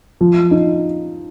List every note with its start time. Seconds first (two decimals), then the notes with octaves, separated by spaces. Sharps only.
0.21 F3
0.51 D#4